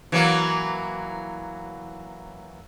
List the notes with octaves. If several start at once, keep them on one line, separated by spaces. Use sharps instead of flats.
E3 F#3 A#3